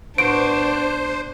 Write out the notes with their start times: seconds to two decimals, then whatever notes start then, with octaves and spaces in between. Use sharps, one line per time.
0.18 A2 B3 D4 F#4 C5 D7